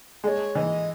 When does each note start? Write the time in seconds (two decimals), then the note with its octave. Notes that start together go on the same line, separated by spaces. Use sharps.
0.24 G#3 C#5 D#5
0.55 E3 D#5